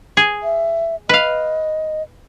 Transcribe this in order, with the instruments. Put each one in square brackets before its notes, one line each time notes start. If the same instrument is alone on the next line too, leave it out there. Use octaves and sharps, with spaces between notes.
[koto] G#4
[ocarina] E5
[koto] B4 F5 [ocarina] D#5